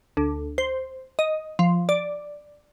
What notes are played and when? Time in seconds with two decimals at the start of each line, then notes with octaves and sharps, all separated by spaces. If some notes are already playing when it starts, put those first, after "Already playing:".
0.17 D2
0.58 C5
1.19 D#5
1.59 F3
1.89 D5